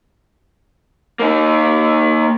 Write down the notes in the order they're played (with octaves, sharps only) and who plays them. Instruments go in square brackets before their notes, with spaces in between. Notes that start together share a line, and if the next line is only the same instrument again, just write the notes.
[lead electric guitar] A#3 D#4